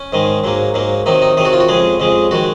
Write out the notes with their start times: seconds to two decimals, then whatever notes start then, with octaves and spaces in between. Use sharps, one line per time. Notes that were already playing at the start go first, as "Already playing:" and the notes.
Already playing: C#4
0.13 G#2 D#3 G#3
0.44 G#2 F#3 A#3
0.74 G#2 F#3 A#3
1.06 C3 D#3 F#3 D#4
1.22 D#4
1.37 C3 D#3 F#3 G#4
1.45 F#4
1.53 F4
1.60 F#4
1.69 F2 C#3 G#3 G#4
2.00 F2 C#3 G#3
2.31 D#3 G#3 F#4